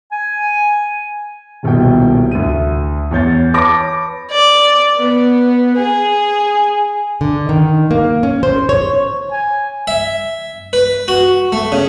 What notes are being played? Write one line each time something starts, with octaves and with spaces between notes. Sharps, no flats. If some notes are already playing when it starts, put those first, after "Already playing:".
G#5
D#1 C2 B2 G5
D2 E5 D#7
E2 C#5 G6 A6
B4 C#5 A5 B5 D6 A#6
D5
B3
G#4
D3
D#3
A#3
C#4
C5
C#5
G#5
E5
B4
F#4
A3
C#3